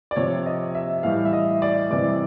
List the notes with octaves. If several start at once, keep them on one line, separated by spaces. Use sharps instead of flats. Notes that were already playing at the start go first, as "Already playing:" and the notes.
D5
C3 F3 C#5
D#5
E5
A2 E3 G3 F5
E5
D#5
D5
C3 E3 G3 D5